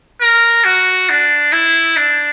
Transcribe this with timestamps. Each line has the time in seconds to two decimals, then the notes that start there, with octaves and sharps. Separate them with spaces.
0.21 A#4
0.65 F#4
1.10 D4
1.53 E4
1.97 D4